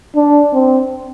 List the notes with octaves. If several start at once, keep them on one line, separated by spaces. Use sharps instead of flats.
D4
C4